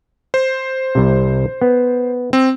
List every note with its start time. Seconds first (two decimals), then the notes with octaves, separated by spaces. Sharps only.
0.34 C5
0.95 C2 C3
1.62 B3
2.33 C4